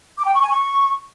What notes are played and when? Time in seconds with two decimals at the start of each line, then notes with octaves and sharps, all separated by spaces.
0.17 D6
0.25 G5
0.33 C#6
0.41 G#5
0.49 C#6